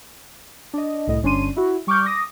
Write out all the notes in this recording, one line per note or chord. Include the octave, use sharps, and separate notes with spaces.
D4 D#5
C2 A2 D#5
G1 C#4 D4 C6 D#7
E4 F#4
G3 C#6 D6 F6 G6
D6 D#6 A#6